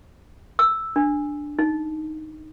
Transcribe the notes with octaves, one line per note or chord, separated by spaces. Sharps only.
E6
D4
D#4